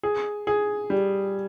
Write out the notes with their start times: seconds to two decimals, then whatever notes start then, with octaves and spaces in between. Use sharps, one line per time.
0.03 G#4
0.47 G#4
0.90 G3